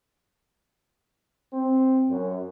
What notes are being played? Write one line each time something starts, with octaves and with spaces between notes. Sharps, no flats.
C4
F#2